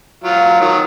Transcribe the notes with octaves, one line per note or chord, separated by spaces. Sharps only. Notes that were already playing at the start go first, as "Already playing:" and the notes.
F#3 F4
D#3 F#3